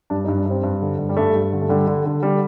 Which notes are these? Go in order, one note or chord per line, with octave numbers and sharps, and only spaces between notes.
G2 D4
D#4
G2
D4
G2 C4
G2
D3
G2
G3
G2 A3
G2
D3
A3
D3 G3
D3
D3
D3 G3